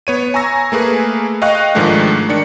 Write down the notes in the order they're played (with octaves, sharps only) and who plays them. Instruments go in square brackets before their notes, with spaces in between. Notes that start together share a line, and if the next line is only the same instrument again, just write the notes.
[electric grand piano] B3 C#5 D#7
G#5 A#5 C#6 E6 A#6
A3 A#3 G#4 B4
D#5 F5 G5 C#6 F#6
G#2 D#3 F3 G#3 A3 D4
D#3 D4 C#7